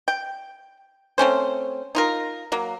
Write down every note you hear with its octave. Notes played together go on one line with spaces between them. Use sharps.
G5
A3 C4 C#4 C5
D#4 F4 A#4
F#3 A#3